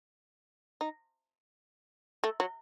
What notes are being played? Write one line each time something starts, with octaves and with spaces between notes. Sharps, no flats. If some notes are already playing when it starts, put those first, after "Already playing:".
D#4
A3
F#3